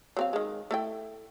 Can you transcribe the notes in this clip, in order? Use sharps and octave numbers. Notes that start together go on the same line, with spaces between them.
F#3 C4 F5
D#3 G#3
A3 E4 G5